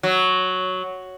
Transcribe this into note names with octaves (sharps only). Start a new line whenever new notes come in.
F#3